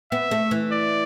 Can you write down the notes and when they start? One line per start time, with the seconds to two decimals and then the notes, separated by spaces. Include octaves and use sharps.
0.12 B3 E5
0.31 A3
0.51 E3
0.72 D5